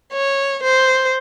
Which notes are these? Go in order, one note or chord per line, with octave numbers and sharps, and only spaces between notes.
C#5
C5